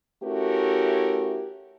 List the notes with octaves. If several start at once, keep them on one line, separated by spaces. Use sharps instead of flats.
A3 C#4 E4 F#4 G4 A#4